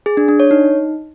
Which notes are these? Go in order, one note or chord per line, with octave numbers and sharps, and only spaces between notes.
G#4
D4
D4
C#5
D#4